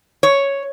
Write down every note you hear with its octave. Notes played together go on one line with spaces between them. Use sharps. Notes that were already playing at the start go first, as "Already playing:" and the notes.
C#5